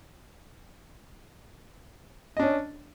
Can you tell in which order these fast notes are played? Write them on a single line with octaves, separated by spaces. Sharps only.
D#5 D4 C#4